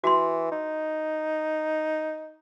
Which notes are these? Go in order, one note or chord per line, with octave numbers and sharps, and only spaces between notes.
E3 F#4 C6
D#4